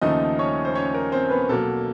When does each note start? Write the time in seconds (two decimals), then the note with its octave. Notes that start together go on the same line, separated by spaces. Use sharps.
0.01 D#2 C#3 F3 A3 D#4 D#5
0.39 C#4 C#5
0.65 C5
0.75 C#4 C#5
0.94 A#4
1.12 C4 C5
1.30 B3 B4
1.49 B1 B2 F#3 A#3 A4